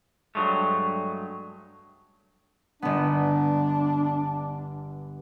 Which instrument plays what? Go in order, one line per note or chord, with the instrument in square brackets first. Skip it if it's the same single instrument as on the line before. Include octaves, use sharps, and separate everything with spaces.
[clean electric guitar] G2 F#3 G#3 A3
[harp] G1 B3 [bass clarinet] D4